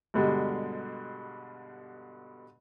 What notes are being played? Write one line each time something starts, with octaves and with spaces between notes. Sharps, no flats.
G2 B2 D3 G3 G#3